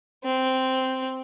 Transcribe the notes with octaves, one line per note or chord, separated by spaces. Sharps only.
C4